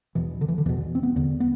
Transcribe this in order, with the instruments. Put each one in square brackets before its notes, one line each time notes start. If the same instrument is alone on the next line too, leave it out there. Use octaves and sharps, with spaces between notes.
[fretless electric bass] E2 B2 E3
D3
E3
D3
E2 B2 E3
C4
B3
E2 D3
B3